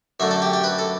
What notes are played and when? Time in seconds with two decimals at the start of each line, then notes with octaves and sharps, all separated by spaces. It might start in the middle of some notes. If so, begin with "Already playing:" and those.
0.20 F#2 D3 A3 E5
0.31 A4
0.42 G4
0.53 G4
0.64 B4
0.79 A4